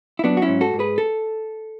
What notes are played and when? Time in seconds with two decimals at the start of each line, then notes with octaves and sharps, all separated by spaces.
0.19 E4
0.24 F#3 B3 D4
0.37 F#4
0.42 C#4 E4
0.48 G#2
0.61 F#4 A4
0.74 G#2
0.79 G#4 B4
0.98 A4